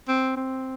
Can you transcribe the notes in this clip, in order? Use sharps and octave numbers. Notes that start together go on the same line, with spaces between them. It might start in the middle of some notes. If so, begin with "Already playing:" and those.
C4
C4